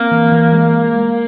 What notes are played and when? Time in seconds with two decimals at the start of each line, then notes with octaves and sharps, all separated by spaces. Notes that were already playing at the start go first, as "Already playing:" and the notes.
Already playing: A#3 C4
0.11 E3
0.32 E3
0.53 G#3